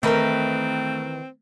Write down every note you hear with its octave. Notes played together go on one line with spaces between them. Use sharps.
D#3 E3 A3 C4 A#4 B4 D#5